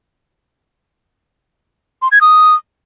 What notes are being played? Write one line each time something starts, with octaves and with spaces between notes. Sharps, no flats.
C6
G#6
D#6